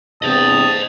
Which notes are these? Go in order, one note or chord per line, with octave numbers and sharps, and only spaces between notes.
E2 G2 C3 C5 D#5 A5 D#6